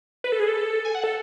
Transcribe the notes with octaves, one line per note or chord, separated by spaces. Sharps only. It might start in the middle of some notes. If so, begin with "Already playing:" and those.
B4
A4
G#4
A4
G#5
F#5
A4